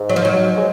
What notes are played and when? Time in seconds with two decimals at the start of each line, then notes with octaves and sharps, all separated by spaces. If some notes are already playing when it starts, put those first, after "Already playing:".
Already playing: G#2
0.09 F#3
0.16 F3
0.25 F#3
0.58 G#3